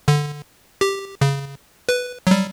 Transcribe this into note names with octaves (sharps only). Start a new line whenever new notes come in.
D3
G4
C#3
B4
F#3 G3